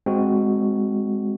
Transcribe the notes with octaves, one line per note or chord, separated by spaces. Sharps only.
G#3 C4 F#4